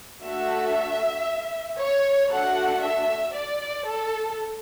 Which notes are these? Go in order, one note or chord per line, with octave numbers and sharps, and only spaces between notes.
A3 D4 F#4 A4 E5
C#5
A3 D4 F#4 A4 F#5
E5
D5
A4